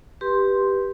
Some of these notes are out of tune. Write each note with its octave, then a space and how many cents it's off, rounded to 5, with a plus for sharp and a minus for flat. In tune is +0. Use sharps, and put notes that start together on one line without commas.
G4 +0 B4 -10 C6 +0